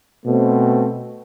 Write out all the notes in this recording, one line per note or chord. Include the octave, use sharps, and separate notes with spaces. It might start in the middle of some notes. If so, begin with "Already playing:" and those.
B2 A3 C4